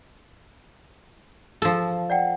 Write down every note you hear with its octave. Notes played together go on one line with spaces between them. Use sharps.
F3 A4
D5 F#5 G5